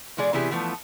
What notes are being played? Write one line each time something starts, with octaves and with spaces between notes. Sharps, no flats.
B2 E3 G#3 G#4 D5
C3 E3 B3 E4 G4 G#4
E3 F3 A3 B3